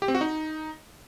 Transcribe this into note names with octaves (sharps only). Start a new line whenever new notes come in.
G4
C4
F#4
D#4